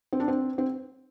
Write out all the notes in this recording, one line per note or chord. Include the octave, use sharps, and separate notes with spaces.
C4
D4
C4
C4